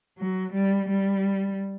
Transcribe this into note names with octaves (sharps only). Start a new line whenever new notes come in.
F#3
G3
G3